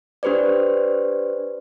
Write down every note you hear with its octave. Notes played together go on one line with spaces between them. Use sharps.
D4 G4 B4 C5 D5